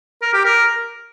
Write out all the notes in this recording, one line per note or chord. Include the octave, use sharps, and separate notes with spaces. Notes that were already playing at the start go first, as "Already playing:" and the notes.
A#4
G4
A#4